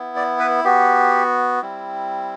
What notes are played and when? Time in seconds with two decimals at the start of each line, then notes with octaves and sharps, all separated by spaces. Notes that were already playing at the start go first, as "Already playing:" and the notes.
Already playing: B3 E4
0.16 D5
0.39 B4
0.64 B3 F#4 G4
1.62 G3 C4 E4